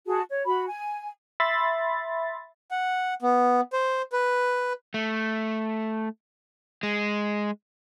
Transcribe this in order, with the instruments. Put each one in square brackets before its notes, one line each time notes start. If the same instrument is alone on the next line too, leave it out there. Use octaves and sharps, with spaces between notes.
[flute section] F#4 G#4 A5
C#5
F#4 B5
G#5
[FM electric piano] E5 B5 C6 A6
[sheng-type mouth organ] F#5
B3
C5
B4
[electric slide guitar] A3
G#3